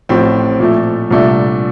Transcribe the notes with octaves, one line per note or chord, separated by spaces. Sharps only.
A1 A2 F3 C4
A#2 F3 A3
C2 A#2 A3 D4